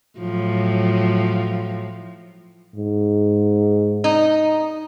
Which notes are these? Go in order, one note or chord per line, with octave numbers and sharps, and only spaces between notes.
A2 F3 F#3
G#2
D#4